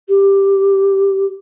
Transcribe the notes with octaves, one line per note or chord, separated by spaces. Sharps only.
G4